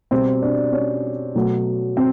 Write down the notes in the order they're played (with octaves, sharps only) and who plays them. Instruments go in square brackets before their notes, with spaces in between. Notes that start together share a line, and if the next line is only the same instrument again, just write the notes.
[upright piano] B2 G3 C4 C5
D4 D5
C#4 C#5
B2 F#3 A3
C4